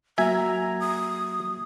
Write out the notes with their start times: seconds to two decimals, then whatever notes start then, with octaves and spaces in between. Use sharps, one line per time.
0.18 F#3 A#3 F#4 E5 G#5 A#5
0.80 D#6